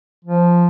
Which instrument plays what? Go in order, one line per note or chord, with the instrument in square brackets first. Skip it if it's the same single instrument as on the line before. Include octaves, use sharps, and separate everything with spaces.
[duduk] F3